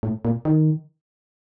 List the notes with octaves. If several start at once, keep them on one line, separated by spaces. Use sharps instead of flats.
A2
A#2
D#3